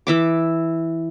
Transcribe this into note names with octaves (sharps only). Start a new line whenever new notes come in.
E3 E5 D6